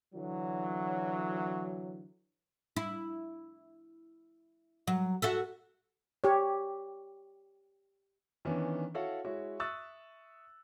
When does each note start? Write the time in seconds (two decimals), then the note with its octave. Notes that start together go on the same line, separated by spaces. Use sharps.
0.14 D3 E3 F#3
2.76 E4
4.87 F#3
5.22 F#4 A4 E5
6.24 G4 C#5
8.45 D#3 E3 B3 C#4 D4
8.94 E4 F#4 A4 C#5 F5 F#5
9.25 G#3 E4 F#4 C#5
9.60 E5 C#6 D#6 E6 F#6 A6